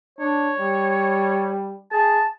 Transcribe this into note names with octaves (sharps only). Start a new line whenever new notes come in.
D4 C#5
G3
G#4 A5